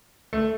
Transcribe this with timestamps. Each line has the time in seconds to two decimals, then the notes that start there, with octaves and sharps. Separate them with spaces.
0.33 A3